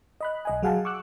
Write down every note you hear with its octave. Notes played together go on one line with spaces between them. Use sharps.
D#5 B5 F#6
B1 D#5 G#5
F#3 G#4 F5 F#5 G#5 A5
C#6 D6 E6 F#6